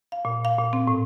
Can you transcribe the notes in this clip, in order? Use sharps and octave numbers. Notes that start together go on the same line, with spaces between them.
F5
A#2
F5
A#2
C4
A2